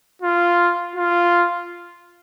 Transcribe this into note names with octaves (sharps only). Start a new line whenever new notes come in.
F4
F4